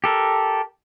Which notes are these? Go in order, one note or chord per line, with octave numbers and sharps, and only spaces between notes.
G4 A4 A#4